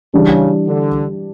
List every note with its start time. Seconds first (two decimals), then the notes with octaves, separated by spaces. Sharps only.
0.14 C#3 E3 G3 D4
0.67 D3